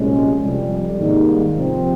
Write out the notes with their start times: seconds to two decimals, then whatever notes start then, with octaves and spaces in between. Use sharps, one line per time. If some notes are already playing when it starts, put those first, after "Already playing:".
Already playing: C2 A#2 F3 G#3 C#4
0.42 F2 C3 G3
0.98 G#2 D#3 G3 A#3 D#4
1.55 C3 F3 C4